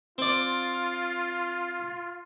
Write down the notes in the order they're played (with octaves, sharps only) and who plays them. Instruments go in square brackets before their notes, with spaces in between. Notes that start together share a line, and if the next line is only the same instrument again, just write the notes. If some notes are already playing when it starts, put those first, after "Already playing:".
[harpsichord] C4 D5 [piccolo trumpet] F4